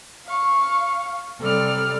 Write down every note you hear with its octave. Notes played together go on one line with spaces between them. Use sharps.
F5 C#6
C3 G3 A4 D5 F6